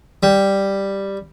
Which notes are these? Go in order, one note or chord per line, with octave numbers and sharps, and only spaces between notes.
G3